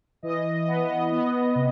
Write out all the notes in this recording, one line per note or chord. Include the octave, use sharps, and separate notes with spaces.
E3 D#5
B3
B3
C3